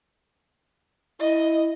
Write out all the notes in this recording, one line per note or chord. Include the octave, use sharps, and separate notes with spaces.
E4 D#5